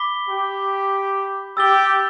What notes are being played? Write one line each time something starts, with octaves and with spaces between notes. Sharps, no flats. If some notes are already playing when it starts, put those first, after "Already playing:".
Already playing: B5 D6 B6 G7
G4
G4 E6 A6 G7